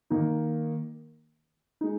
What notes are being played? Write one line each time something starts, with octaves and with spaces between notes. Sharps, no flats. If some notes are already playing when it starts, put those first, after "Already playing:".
D#3 A#3 D#4
G#3 D#4